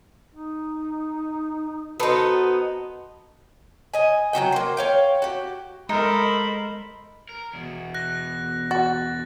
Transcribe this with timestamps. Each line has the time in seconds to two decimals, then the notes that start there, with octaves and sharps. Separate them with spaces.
0.35 D#4
2.00 B3 D#4 F#4 A4 B4 C5
3.94 D#5 G#5
4.33 F#3 C4 F#4 G5
4.52 A#3 C5
4.77 C#5 F5 G5
5.22 F#4 G4
5.89 G#3 D#4 A4 A#4 C5 B5
7.29 A#4
7.53 E2 B2
7.94 F#6 A#6
8.71 F#4 A6